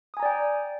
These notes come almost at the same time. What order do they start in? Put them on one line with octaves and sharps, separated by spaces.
D#6 G#5 A#5 D5 G5